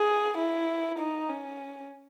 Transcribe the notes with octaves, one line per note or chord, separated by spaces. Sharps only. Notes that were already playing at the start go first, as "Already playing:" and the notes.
Already playing: G#4
E4
D#4
C#4